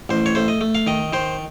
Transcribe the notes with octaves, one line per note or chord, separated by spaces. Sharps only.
A1 C5
C#5
A3 C5
D#5
A3
F5
D#3 D#5
D#3 C5